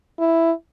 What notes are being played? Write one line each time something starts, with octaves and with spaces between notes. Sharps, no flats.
E4